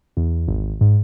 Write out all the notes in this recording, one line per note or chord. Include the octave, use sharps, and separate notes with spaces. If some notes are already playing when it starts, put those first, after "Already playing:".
E2
G#1
G#2